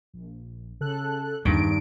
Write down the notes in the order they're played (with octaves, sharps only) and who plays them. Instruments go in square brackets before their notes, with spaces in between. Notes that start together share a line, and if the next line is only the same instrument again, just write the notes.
[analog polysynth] A#1
C#3 A4 F#6
[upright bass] E2 [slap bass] G2 D#3 [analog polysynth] D4 D7